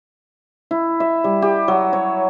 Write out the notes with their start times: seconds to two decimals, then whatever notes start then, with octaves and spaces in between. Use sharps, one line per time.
0.71 E4
1.00 E5
1.24 G3
1.42 G4
1.68 F#3
1.93 C#5